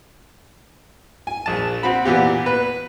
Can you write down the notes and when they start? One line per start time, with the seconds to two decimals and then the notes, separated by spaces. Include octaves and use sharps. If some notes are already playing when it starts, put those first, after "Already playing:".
1.27 G#5
1.46 A#1 A5
1.83 C4 F#4 B5
2.04 A#2 E3 B3 G4 F5
2.46 B4